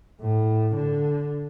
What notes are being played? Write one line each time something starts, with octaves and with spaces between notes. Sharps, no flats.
A2
D3